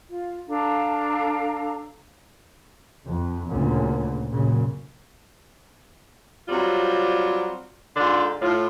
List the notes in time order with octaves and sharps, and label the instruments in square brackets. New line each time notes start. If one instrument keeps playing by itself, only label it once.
[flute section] F4
D4 A4 F5 A#5
[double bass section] F2
D2 A#2 C#3
F#2 A#2 C#3
[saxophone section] F#3 G3 C4 F4
G#2 D3 F4 D5
A2 F4